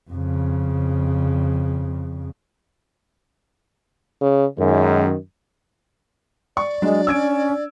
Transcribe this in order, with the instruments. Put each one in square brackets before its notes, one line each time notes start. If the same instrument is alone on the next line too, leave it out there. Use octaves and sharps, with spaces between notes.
[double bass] F2 C#3
[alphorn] C#3
[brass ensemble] F#2 D#3 [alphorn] G#3
[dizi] D5 [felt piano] C#6
[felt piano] F#3 [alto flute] G#3 [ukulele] D4
[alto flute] C#4 [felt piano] E6 G#6 D7